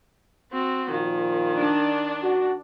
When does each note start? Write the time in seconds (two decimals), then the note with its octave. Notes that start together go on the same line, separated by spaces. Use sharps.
0.53 C4 F#4
0.91 A#2 D#3 F3 F4
1.56 D4
2.22 F#4